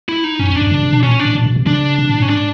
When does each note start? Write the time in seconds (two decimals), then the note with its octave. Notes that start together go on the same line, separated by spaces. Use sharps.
0.09 E4
0.24 D#4
0.39 F#2 C#4
0.50 F2
0.56 D4
0.61 G2
0.71 C#3
0.82 C3
0.92 B2
1.03 A#2 C#4
1.20 D4
1.25 A2
1.35 A#2
1.46 B2
1.56 C3
1.66 C#3 D4
1.98 C3
2.09 A2
2.20 G#2 C#4
2.29 D4